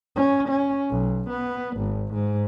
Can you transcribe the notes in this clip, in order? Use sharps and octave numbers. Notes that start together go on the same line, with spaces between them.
C#4
C#4
B1
B3
G#1
G#2